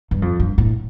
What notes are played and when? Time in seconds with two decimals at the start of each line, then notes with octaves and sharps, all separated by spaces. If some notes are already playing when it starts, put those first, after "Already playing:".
0.11 G2
0.22 F2
0.40 G2
0.58 A2